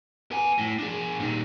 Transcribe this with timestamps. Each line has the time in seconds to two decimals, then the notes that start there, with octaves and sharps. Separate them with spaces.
0.31 B3 G#5
0.59 A2
0.79 D4 G#4
1.20 A#2 D#3